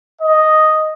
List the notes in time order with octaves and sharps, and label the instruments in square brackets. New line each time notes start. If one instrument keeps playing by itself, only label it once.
[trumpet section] D#5